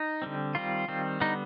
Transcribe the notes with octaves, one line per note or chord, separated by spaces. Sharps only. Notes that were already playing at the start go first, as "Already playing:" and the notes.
Already playing: D#4
D3 G3 C4
D#3 G3 C4 F4
D#3 G3 C4
D3 G3 B3 D#4